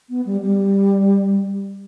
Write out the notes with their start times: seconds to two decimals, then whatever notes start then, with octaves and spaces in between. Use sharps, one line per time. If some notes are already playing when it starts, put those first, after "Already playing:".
0.09 B3
0.26 G3
0.42 G3